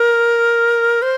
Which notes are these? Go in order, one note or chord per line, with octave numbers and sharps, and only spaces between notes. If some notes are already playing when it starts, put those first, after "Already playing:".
Already playing: A#4
C5